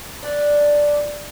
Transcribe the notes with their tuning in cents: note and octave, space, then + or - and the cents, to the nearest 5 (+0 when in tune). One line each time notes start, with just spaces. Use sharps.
D4 +0